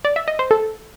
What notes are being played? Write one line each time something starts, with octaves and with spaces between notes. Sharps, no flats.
D5
E5
D#5
C5
A4